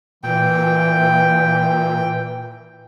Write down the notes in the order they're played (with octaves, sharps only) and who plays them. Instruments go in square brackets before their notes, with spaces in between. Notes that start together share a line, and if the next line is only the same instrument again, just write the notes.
[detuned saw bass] A#2 [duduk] E3 [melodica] G5